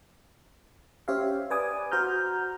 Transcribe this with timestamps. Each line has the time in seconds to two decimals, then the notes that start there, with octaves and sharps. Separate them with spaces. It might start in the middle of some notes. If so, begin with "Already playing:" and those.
1.08 C#4 G4 C5 C#5 E5 F5
1.50 B4 D5 G#5 D6 D#6
1.91 F#4 C5 A#5 F6 G6